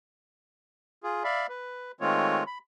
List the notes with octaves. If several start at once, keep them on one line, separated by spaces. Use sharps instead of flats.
F4 G#4
D5 E5 F5 B5
B4
D#3 G#3 A3 C4 F4 C#5
B5